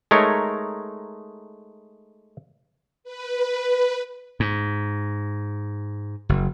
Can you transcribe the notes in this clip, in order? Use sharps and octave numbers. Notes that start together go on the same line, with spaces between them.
G#3 A3 D#4 A#4 C#5
B4
G#2
F#1